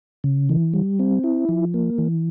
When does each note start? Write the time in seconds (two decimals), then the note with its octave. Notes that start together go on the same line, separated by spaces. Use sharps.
0.24 C#3
0.49 E3
0.74 G3
0.99 C4
1.24 E4
1.49 F3
1.74 A#3
1.98 E3